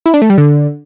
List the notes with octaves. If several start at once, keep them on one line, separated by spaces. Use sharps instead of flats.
E4
D4
A3
G3
D3